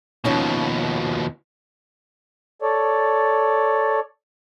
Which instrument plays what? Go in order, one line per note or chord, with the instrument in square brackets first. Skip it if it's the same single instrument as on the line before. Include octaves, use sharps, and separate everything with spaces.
[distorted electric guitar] D#2 B2 [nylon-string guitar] F3 C#4 D#4
[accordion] A4 C#5 D5